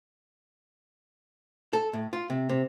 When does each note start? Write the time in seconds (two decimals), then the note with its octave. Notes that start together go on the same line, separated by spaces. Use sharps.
1.73 A4
1.93 A2
2.13 F4
2.30 C3
2.49 C3